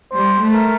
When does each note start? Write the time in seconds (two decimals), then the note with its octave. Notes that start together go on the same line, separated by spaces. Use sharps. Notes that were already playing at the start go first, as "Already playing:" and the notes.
0.12 G3 C5
0.41 A3
0.54 A#4